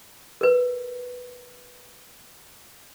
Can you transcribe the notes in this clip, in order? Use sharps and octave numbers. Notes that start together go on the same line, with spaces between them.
A#4 B4